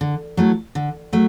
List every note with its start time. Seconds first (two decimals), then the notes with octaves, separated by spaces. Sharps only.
0.01 D3
0.37 F#3 A3 E4
0.75 D3
1.13 F#3 A3